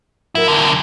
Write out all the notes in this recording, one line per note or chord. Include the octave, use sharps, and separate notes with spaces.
F#3 E4 A#4
E2 D3